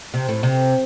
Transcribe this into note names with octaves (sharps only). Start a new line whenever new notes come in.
C3
A2
C3